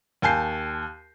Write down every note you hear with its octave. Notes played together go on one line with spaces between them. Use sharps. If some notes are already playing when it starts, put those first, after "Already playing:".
D#2 G#5 A5 G6 C7